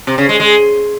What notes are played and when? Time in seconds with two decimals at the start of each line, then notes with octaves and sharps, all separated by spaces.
0.07 C3
0.18 C#3
0.29 G#3
0.40 G#3